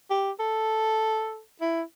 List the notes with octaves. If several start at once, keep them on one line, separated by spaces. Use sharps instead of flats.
G4
A4
E4